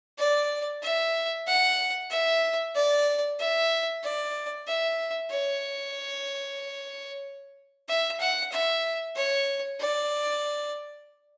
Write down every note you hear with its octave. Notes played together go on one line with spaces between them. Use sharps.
D5
E5
F#5
E5
D5
E5
D5
E5
C#5
E5
F#5
E5
C#5
D5